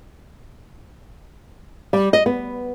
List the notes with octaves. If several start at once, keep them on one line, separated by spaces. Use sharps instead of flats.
G3
D#5
B3